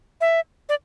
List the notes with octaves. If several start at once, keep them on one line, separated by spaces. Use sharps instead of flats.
E5
D5